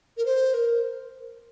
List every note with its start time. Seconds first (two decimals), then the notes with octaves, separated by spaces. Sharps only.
0.17 A#4
0.25 C5
0.54 A#4